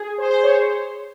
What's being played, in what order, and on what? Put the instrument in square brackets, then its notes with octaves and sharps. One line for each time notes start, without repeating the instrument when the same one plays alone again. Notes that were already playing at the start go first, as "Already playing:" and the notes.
Already playing: [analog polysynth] G#4
C5
C5
C#5